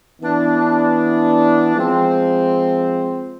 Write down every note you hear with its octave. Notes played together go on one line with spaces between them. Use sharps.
E3 B3 D4
F3 G#3 C4